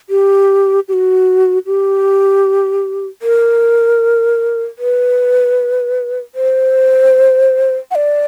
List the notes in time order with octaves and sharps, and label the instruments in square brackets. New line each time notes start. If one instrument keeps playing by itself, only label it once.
[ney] G4
G4
F#4
G4
A#4
B4
C5
F#5
D5